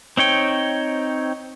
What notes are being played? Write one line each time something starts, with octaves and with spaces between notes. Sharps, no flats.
C4 D#4 C#5 G5